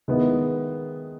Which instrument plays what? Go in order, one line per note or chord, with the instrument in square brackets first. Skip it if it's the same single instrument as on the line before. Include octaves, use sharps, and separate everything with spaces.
[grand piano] D#3 G#3 B3 E4